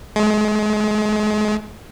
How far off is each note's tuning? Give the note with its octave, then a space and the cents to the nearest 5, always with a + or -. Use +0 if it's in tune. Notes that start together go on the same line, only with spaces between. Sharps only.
G#3 +35